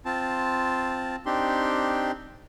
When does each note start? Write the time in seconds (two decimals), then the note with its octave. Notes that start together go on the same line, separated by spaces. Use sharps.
0.06 C4 F4 A5
1.26 C4 D4 D#4 G4 C6